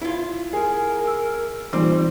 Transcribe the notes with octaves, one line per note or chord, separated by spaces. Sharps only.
E4 F4
G#4 A#4
E6
A#2 E3 G3 C4 D#4 C5